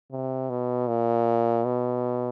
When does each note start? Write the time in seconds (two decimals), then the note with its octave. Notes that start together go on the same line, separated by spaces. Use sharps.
0.11 C3
0.50 B2
0.88 A#2
1.65 B2